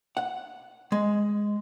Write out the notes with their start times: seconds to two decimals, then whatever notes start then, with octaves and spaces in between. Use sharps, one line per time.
0.17 F#5
0.92 G#3